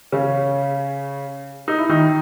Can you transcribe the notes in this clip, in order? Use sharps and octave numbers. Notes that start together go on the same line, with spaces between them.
C#3 C#4
D#4
E4
D#3 D#4